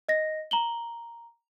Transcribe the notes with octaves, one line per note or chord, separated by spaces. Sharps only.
D#5 A#6
A#5 F#7 G7